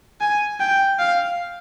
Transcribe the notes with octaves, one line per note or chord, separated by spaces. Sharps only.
G#5
G5
F5